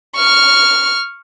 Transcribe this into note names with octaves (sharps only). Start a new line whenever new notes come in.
C#6 F6